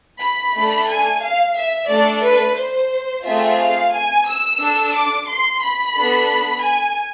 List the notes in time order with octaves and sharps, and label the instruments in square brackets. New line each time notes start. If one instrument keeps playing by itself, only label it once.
[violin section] B5
A3 D4 A4
G#5
F5
E5
A3 D4 A4 D5
B4
C5
A3 C4 F4 G#4 E5
F5
G#5
E6
D4 A4
D6
C6
B5
B3 D4 A4
G#5